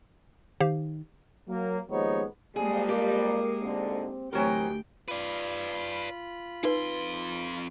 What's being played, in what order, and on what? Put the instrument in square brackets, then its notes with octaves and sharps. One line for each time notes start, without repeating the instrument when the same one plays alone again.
[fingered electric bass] D#3 [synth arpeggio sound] G4 C5 F5
[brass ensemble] F#3 A#3
D#2 F3 G#3 B3 D#4 C#5
[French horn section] F2 G3 [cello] G#3 A#3 [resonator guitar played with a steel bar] G#4
[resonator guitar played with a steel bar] G4 [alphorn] A#4
[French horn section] D2 G#2 D3 [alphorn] C4
[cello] D2 G5 [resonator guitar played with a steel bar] E3 F#3 A#4 [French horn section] C4 [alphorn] G4
[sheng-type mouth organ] F4 B5 [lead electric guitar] B4 D5
[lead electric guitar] F2 C6 [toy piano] D#4 B4